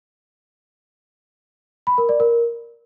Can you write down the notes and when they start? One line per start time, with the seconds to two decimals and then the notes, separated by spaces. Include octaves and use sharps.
1.87 B5
1.98 A#4
2.09 D5
2.20 A#4